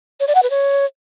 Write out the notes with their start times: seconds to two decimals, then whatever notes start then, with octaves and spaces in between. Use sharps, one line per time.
0.20 C#5
0.28 D5
0.35 F#5
0.43 B4
0.50 C#5